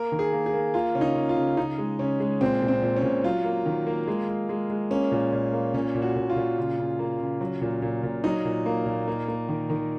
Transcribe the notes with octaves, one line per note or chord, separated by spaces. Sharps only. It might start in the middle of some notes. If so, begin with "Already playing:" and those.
Already playing: A#3 A#4
D#3
G#4
A#3
G#4
A#3
A#3 F4
C#3 C#4
D#4
C#3
F4
C#3
C#3 D#4
G#3
C#3 C#4
G#3
A#2 C4
A#2
C4
A#2
C#4
A#2
F#3 F4
A#3
D#3
A#3
G#3
G#3
G#3
G#3
A#3 C#4
A#2
A#2
A#3
A#2 C#4
A#2
F#4
A#2
F4
A#2
C#3
C#3
A#3
C#3
F#3
A#2
A#2
A#2
F#3 D#4
A#2
A#3
A#2
A#3
A#3
D#3
D#3